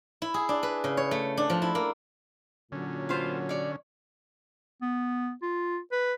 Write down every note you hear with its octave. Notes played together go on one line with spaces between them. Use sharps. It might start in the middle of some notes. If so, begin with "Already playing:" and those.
E4
G#4
D4
B4
C#3
C#5
A3
D4
F3
E4
A#3
A#2 D3 F#3 C#4
B3 F4 C5
C#5 D5
B3
F4
B4